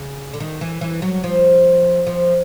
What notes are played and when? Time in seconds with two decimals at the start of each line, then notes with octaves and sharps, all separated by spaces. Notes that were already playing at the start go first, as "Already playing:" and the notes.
Already playing: C#3
0.34 D3
0.40 D#3
0.61 E3
0.81 E3
1.02 F#3
1.24 F3
2.07 F3